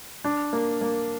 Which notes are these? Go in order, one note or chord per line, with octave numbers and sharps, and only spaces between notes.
D4
A#3
A#3